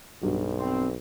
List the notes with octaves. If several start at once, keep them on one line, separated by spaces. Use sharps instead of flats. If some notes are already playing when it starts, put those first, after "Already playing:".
B1 G2 F#3
C4